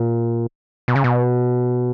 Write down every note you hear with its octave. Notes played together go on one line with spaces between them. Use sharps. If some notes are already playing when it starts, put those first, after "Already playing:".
Already playing: A#2
B2
C#3
B2